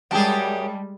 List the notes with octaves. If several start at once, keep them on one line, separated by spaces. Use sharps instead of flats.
F#2 G3 G#3 G4 G#4 G5 A5